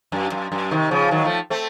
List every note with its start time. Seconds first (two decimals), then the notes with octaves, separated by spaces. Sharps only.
0.12 F#2
0.32 F#2
0.52 F#2
0.71 C3 D#3
0.91 C#3 F3
1.11 D#3 F#3
1.24 F3 A3
1.50 A3 C4